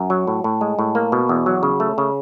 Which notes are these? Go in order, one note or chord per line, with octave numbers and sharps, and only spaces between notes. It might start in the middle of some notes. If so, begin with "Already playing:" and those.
Already playing: F#2
F#3
A2
A2
G#3
A2
A#3
B2
E2
F#3
C#3
A3
C#3